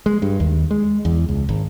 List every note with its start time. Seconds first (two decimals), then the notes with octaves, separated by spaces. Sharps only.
0.06 G#3
0.22 G2
0.40 D#2
0.71 G#3
1.05 E2
1.29 C#2
1.49 G#1